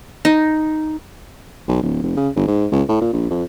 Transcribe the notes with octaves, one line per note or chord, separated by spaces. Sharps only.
D#4
B1
D1
F1
C#3
G1
G#2
C#2
A2
A#2
A#1
F2